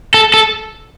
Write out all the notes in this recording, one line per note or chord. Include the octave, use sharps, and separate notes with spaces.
A4
A4